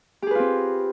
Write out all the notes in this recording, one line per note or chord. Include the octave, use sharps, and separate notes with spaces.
C4 F4 G4 G#4 B4